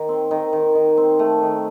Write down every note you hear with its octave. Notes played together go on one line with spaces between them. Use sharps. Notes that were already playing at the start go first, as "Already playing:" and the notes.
Already playing: D#3
C4
D#3
D#3
D#3
C4
A3
D#3